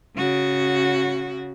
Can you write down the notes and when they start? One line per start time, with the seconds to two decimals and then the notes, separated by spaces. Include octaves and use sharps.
0.16 C#3 F#4